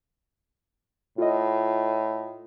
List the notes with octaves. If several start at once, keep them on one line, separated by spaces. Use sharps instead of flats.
A2 F4 D#5